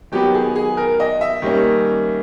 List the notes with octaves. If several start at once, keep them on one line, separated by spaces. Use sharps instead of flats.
D#3 F#3 B3 G4
G#4
G#4
A#4
D#5
E5
D#3 G3 A#3 C#4